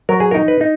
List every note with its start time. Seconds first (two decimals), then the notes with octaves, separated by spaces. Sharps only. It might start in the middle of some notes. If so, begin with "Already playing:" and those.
0.09 F#3 A#4
0.20 G#4
0.31 A#4
0.34 D#4
0.48 B4
0.61 D#4